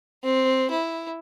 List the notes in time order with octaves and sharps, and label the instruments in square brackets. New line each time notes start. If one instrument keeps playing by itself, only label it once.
[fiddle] C4
E4